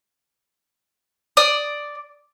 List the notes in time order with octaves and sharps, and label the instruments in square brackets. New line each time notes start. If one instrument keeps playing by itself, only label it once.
[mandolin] D5 D#6